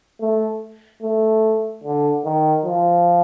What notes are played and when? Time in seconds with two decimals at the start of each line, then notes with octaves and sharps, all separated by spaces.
0.20 A3
1.02 A3
1.83 D3
2.25 D#3
2.65 F3